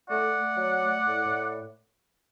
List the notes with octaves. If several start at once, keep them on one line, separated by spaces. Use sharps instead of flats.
A3 D5 F#5
A3
F#3
A3
A2
A2